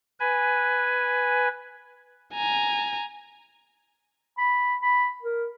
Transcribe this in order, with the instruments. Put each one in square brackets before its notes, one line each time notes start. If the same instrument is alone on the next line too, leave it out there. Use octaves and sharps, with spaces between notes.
[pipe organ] B4 G#5
[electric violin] G#5 A#5
[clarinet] B5
B5
A#4